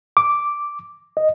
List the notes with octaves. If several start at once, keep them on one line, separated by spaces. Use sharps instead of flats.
D6
D#5